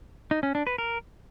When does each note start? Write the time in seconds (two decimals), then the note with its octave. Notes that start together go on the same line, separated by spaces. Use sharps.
0.31 D#4
0.43 C#4
0.55 D4
0.67 B4
0.78 A#4